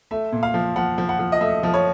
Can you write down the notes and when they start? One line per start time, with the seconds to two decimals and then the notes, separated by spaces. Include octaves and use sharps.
0.11 A3 E5
0.32 A#2
0.43 F5
0.54 F3
0.76 F3 F#5
0.98 F3
1.09 F#5
1.19 F3
1.32 D#5
1.41 A3 E5
1.63 F3
1.74 C#5